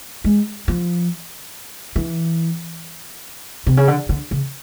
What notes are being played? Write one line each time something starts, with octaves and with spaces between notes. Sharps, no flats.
G#3
F3
E3
C3
C#3
D3
D3
C#3